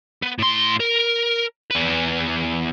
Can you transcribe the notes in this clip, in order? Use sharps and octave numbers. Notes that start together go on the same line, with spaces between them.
B3
A2 C6
A#4
E2 B4